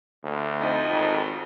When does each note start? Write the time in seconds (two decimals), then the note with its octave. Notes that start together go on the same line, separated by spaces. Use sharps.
0.24 D2
0.60 F2 D#4
0.92 G#1